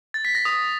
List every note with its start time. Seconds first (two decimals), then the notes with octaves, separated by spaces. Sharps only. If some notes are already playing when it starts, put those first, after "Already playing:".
0.14 A6
0.25 B6
0.35 A#6
0.45 D#6